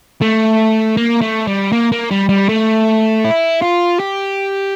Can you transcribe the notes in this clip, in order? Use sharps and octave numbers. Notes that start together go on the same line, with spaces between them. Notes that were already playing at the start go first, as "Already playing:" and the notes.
A3
A#3
A3
G3
A#3
A#3
G3
G3
A3
E4
F4
G4